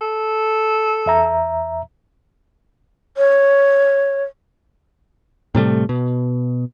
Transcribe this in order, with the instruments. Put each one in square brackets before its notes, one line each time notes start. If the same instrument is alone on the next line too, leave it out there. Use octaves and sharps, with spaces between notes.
[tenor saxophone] A4
[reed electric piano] E2 E5 A#5
[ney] C#5
[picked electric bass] A2 C3 G3 A3
B2